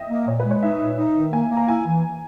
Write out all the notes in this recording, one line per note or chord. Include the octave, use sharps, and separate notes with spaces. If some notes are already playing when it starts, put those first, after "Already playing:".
Already playing: D#5 E5 G5
A#3
A#2 C#5
B4
G#3
C#5
D#4 E5
A#2
D#4
D#3
A#3 G#5
A#3
A#5
E4 G#5
E3